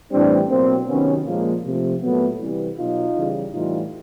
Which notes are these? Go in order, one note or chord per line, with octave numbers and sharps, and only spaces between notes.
A2 E3 G3 C4 D4
B2 F#3 A#3 C4
C3 D#3 F#3 B3 C#4
A#2 F3 G#3 A#3
C3 F3 A3
A#2 F#3 A3 B3
C3 E3 G3
B2 F#3 D#4 F4
C#3 E3 G3
A2 E3 G3 D#4 F4